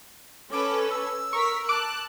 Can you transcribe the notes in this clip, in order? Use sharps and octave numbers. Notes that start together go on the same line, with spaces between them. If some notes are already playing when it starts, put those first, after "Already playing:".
C#4 A4 B4 D6
E6
A#4 C#6 B6
A5 D6 F#6